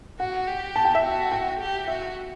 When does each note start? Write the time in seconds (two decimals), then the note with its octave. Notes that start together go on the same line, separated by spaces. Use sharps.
0.19 F#4 F#5
0.47 G4
0.76 A5
0.85 G5
0.95 E5
1.03 F#4
1.31 G5
1.60 G4
1.88 F#4 E5